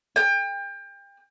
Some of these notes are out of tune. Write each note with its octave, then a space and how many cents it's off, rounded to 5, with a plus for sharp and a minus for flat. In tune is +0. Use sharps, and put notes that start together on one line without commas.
G5 +30